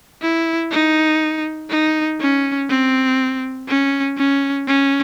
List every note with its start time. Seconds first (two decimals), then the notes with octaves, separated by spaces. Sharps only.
0.22 E4
0.71 D#4
1.70 D#4
2.20 C#4
2.69 C4
3.68 C#4
4.18 C#4
4.67 C#4